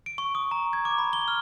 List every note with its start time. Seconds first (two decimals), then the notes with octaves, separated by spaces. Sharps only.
0.06 D7
0.18 C#6
0.35 D#6
0.51 A#5
0.73 G#6
0.85 D6
0.98 B5
1.13 G7
1.28 F6